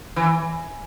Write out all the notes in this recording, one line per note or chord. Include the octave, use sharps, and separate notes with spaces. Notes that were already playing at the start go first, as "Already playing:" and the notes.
E3